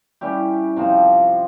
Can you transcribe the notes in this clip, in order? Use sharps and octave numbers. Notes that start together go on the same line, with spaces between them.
G3 C#4 E4 G4
C3 F3 C4